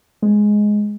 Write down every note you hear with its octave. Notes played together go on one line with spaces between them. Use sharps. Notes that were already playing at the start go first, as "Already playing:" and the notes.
G#3